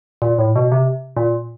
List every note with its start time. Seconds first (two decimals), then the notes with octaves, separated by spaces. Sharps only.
0.22 A#2
0.38 A2
0.56 B2
0.72 C3
1.17 A#2